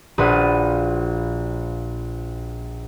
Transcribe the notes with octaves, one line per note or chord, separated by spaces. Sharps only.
A#1 F3 F#4 B4 C5 D#6